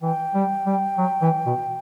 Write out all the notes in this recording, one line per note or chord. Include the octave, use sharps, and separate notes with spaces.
E3 G5
G3
G3
F#3
E3
B2